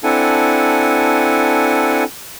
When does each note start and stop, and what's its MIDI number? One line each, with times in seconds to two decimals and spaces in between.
0.04 2.04 60
0.04 2.04 62
0.04 2.04 64
0.04 2.04 69
0.04 2.04 78
0.04 2.04 80